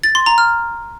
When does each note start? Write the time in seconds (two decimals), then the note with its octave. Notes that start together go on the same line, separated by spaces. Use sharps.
0.04 A6
0.15 C6
0.26 A#5
0.38 F6